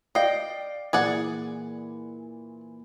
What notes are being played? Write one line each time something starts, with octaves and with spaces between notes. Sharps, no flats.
D5 D#5 F5 G5 C7
A#2 E3 G#4 D5 F#5